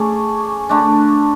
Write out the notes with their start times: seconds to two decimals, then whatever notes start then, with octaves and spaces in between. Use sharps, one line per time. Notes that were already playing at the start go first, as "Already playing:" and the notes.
Already playing: A3 C#4 G#4 D5
0.69 D3 A3 D4